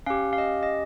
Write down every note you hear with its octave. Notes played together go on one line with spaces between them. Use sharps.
C#4 G4 F5
F5
D#5
D#5